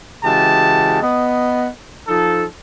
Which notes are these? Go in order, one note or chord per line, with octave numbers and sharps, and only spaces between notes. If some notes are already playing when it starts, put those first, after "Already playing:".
C#3 E3 G#3 F#4 G4 A5
B3 D#5
F3 D#4 A4